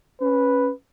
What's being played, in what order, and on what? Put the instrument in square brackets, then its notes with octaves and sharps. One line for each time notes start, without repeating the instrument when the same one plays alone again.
[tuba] C#4 [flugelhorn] B4